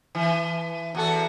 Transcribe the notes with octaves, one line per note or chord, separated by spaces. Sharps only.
E3
E2 F#4 A4